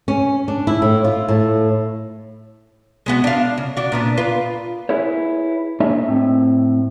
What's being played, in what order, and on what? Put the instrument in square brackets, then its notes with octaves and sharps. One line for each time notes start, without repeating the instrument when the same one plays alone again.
[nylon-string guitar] C#4
D4
E4
A2
F4
A2
[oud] G#3 B3 F#4
D4 F5
C#3
D4 F#4
A#2 B3 D4
F4 B4
[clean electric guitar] E4 G#4 B4 C#5
A#3 D4 G#4 C#5 D#5 E5
A2 C4